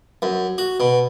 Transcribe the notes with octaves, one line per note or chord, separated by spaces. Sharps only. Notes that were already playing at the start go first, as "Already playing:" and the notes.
F#2
F#4
B2